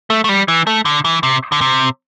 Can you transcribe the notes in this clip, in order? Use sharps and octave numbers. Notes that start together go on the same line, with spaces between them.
A3
A3
G3
E3
A3
D3
E3
C3
D3
C3